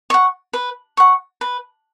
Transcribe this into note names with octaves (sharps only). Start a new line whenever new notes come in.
F#5 C#6
B4
F#5 C#6
B4